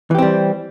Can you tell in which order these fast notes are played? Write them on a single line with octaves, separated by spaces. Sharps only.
E3 G4 C4 G3